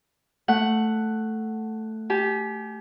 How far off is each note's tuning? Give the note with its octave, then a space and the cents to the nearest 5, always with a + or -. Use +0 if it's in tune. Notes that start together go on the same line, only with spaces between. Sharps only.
A3 +0 F#5 +5
G4 +0 G#5 +40